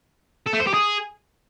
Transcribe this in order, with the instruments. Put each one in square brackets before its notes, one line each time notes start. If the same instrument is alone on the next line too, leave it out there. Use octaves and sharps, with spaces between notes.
[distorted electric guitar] A4
A3
C5
G4
G#4